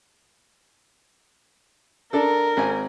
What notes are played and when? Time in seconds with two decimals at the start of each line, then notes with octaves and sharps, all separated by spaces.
2.13 D4 A4 A#4
2.57 G#1 C4 G#5